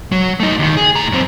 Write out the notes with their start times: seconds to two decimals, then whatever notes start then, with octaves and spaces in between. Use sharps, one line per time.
0.12 F#3
0.40 A3 D#4
0.59 D#2 D#3
0.77 G#4
0.96 A2 A#5
1.12 F#2 C4